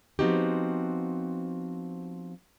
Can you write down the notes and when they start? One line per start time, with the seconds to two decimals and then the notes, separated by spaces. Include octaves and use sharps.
0.19 F3 B3 C4 D#4 F#4 G4